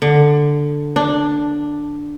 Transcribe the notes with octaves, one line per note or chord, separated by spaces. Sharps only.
D3
D4